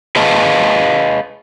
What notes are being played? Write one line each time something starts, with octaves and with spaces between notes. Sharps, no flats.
G#4 B4 D#5 F5 A5